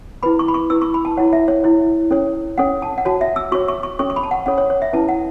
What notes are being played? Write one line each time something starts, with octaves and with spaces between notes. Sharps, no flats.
E4 B4 B5
C#6
B5
C#6
E4 B4 E6
C#6
B5
A5
E4 C#5 F#5
E5
C#5
E4 C#5
C#4 A4 C#5
C#4 A4 C#5 F#5
A5
F#5
F#4 C#5 A5
E5
E6
F#4 C#5 C#6
C#6
C#6
C#4 A4 C#5 C#6
C#6
B5
A5
F#5
C#4 A4 C#5 F#5
C#5
C#5
E5
C#4 E4 B4 A5
F#5